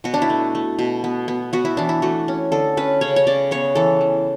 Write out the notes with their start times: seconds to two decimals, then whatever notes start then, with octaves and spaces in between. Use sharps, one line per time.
0.04 B2 F#4
0.14 D4
0.22 E4
0.30 A3
0.55 A3
0.79 B2
1.04 B3
1.28 B3
1.53 B3 F#4
1.65 E4
1.77 E3 D4
1.89 E4
2.02 A3 F#4
2.28 C#4
2.52 D3 A4
2.77 C#4 B4
3.01 C#3 C#5
3.16 C#5
3.27 C#3 D5
3.51 B3 C#5
3.75 E3 A4
4.01 E3